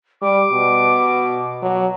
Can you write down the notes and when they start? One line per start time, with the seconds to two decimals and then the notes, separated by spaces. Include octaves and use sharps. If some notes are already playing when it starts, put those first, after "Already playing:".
0.22 G3 D6
0.52 B2
1.62 F#3